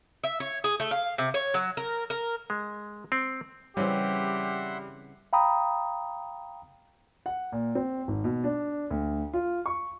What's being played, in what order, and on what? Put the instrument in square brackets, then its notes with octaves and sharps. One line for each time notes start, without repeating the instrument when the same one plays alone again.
[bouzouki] E5
C#5
G#4
A3
F5
C3
C#5
F#3
A#4
A#4
[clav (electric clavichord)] G#3
C4
[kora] C#3 E3 C4 [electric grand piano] G3 [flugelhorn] G4 [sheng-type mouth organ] E5 F#5 C6
[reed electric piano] F5 G5 A#5 B5 D#6
[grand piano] F#5
A#2
C4
G#1
B2
D4
D2
F4
C#6